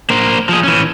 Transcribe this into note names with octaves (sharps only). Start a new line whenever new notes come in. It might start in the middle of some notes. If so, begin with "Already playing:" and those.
A#3 C5
F3 G#4
E3 C#4